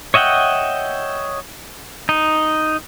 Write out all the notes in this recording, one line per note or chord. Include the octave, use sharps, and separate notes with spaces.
C#5 D#5 E5 F#5 G5
D#4